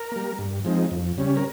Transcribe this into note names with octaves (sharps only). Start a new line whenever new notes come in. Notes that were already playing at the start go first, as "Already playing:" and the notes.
Already playing: A#4
G3 A#3
G2
F3 G#3 C4 D#4
F2
C#3 G3 C#4
A#4